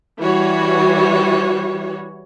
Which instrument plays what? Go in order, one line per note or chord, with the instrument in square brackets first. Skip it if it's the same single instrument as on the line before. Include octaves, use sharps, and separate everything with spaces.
[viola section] E3 G3 F#4 C#5